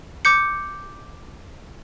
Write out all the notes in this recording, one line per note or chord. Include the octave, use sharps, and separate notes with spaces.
D6 G6 C#7